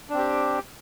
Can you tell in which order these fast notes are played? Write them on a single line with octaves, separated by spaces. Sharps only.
D4 C4 G4